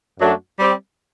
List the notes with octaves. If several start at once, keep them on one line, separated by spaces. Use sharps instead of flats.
F#2 F#3 A3 D4 F#4
G3 C4 G4